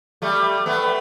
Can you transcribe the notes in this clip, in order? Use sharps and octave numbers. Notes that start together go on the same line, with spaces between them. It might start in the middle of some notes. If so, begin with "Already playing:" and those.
G3 A3
A3 B3